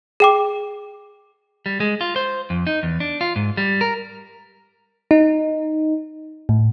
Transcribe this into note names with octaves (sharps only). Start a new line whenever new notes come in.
G#4 G5 D6
G3
G#3
F4
C5
F2
D#4
E2
D4
F4
G#2
G3
A#4
D#4
A2